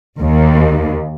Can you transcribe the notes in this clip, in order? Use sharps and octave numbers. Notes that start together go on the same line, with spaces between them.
D#2